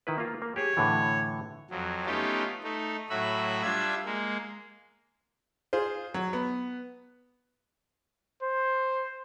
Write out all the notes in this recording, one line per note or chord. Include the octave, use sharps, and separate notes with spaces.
D#3 E4 B4
A#3 F4
A#3
G4 G#4 C#5
A2 D3 E3
F2 F#3
A3 B3 C#4 D#4 F4 G4
A3 D#4
A2 F#3 F#4 E5 B5
G3 D4 F4 E5 G#6
G#3 A#3
F4 G#4 C5
F#3
B3
C5